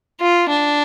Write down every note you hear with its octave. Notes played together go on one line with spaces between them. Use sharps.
F4
D4